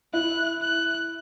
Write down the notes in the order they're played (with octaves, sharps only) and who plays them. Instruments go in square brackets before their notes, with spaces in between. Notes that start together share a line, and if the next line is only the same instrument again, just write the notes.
[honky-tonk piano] E4 [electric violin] F#6
[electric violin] F#6